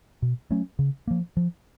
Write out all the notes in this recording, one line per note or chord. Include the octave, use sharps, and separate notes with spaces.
B2
F#3 A3 C#4
C#3
F3 A#3
F3